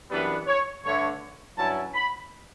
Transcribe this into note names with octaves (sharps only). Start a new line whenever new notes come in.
F#2 E3 G3 B3 D4 B4
C#5
G2 D3 A3 C#5
G2 F#3 C#4 E4 A5
B5